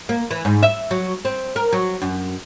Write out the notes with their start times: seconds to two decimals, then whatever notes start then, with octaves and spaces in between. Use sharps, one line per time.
0.09 A#3
0.31 E3
0.45 G#2
0.63 E5
0.91 F#3
1.25 C4
1.56 A#4
1.73 F#3
2.02 F#2